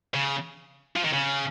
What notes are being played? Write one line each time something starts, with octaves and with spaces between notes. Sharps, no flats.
C#3
F3
D#3
C#3